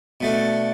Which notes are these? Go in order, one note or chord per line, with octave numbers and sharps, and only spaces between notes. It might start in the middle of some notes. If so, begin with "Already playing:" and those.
B2 A3 D4